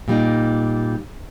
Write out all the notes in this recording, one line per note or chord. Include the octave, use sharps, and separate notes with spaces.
A#2 G3 A#3 D#4